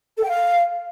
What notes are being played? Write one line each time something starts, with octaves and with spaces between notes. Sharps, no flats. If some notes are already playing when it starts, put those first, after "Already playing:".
A4
G5
F5